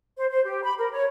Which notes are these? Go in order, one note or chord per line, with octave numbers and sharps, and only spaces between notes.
C5
C5
G4
B5
A#4
C#5